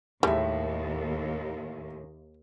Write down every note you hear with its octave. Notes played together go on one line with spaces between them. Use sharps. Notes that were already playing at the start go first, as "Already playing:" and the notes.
D#2 A2 G3 G#3 A4 E5